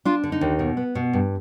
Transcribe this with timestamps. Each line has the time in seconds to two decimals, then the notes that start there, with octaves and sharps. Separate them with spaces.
0.05 D4 F4
0.23 D3
0.32 D#4
0.41 D#2
0.59 B2
0.77 B3
0.95 B2
1.13 G2